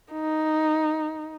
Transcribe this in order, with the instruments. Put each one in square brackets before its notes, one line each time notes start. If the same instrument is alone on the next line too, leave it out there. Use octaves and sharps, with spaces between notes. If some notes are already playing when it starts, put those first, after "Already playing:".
[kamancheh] D#4